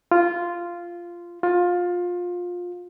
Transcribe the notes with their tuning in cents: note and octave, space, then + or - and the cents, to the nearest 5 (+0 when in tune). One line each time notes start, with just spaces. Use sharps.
F4 -10
F4 +20